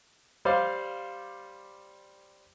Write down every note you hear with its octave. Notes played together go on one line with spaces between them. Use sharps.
G3 C5 D5 F5